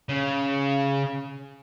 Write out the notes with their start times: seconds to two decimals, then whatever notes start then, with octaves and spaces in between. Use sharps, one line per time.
0.09 C#3